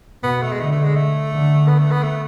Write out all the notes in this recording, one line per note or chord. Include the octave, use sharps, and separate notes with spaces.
B2 B3
A3
G#3
D3 A3
A3
G#3
A3
D3
B3
A3
B3
A3